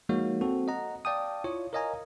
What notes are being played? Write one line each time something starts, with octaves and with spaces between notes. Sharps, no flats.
F3 G#3 A#3 D#4 F#4 C#5
C4 F#4 A4
D#5 F#5 A#5
D5 F5 G5 A5 D#6
E4 F4 C#5
A#4 C#5 D#5 F5 G#5 A#5